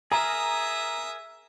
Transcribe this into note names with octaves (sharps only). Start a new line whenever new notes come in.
G#4 A#4 E5 A#5 D#6